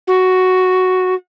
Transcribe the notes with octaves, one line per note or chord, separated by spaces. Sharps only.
F#4